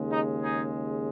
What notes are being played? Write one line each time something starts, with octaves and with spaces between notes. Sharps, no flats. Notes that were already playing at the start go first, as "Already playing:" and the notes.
Already playing: D#2 C#3 G#3
D#4
D#4 G#4